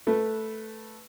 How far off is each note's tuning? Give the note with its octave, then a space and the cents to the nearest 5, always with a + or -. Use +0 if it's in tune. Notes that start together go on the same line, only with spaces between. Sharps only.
A3 +0 B4 -10